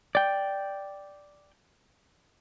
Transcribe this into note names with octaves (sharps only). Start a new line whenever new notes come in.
D5 G5